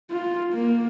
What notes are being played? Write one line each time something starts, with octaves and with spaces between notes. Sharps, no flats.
F4
A#3